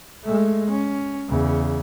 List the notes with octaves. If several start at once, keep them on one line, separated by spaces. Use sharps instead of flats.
G#3 A3
C#4
E2 C#3